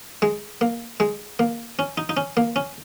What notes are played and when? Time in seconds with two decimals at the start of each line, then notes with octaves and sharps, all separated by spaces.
0.22 G#3
0.61 A#3
1.00 G#3
1.39 A#3
1.79 C#4
1.98 D#4
2.09 D#4
2.17 C#4
2.37 A#3
2.56 C#4